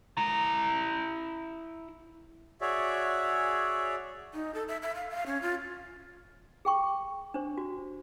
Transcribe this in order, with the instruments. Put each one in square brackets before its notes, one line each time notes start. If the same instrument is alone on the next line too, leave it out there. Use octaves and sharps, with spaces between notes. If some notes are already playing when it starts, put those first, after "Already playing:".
[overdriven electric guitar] E4 A#5
[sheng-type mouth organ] F#4 G#4 C#5 D5 E5
[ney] D#4
A4
E5
E5
F5
F5
C#4
F4
[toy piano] G#4 G5 C#6
D4 C5
F#4